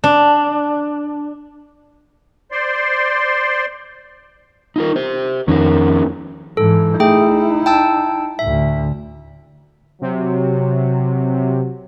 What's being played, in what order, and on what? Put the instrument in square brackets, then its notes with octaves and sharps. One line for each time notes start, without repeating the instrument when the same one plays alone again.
[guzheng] D4
[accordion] C5 D5 C6
[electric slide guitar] D#4 F4 A#4
G4 C5
[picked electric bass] F2 D#3 [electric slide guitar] C#4 A#4
[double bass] G#2 E3 [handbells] A4
[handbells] A3 G#4 G5 [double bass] D#4 E4
[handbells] G5 A5 E6
[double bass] D2 A2 [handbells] E5
[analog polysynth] C3 [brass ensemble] F#3